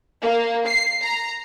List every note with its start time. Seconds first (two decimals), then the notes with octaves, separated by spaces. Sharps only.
0.22 A#3
0.67 C7
1.02 A#5